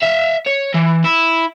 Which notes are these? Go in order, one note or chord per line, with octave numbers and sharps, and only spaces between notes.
E5 F5
C#5
E3
E4